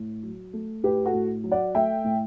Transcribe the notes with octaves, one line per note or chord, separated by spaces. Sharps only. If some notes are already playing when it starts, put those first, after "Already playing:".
Already playing: A2
F#3
A3
A2 G4 B4
F#4 A4
A2
F#3
D5 F#5
A3 E5 G5
A2